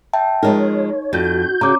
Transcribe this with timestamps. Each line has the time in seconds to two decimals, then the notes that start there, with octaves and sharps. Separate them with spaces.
0.13 E5 G5 A5
0.43 F3 G#3 D#4 A#4 C#5
1.13 F2 F#4 G6
1.61 C#3 A#5 D6